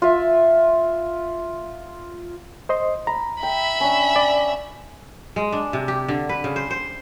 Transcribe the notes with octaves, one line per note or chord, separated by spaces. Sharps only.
F4 E5
C5 D#5 C6
A#5 B5
E5 G5 B5
C#4 D4
D5
G#3
D4
C3
G4
D3
B4
C#3
C5
C5